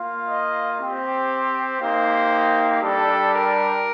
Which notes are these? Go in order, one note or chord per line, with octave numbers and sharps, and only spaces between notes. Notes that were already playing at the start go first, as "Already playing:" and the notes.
Already playing: A#3 F4
D#5
C4 G4
A#3 D#4 G4 C5
G3 D4 G4 A4
A#4